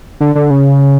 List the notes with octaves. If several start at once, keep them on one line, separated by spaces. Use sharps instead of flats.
D3
D3
C#3